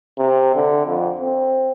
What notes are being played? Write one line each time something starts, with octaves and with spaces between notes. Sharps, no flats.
C3
D3
F2
C4